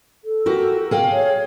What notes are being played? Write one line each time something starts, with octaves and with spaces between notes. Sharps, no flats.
A4
F#4 G4 A#4
G#4 F5 G5
C#5